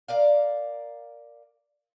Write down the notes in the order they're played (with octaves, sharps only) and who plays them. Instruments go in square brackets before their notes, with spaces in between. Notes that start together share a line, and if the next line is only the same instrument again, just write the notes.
[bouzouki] A#4 D5 F5